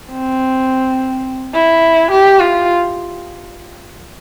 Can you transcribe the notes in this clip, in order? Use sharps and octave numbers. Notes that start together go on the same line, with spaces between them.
C4
E4
G4
F4